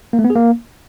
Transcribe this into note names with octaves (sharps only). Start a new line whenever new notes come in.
A#3
A3
B3
G#4
A#3